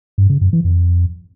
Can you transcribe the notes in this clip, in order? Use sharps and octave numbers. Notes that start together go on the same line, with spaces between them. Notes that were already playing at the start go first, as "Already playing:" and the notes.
G2
C#3
F#2
E3
F2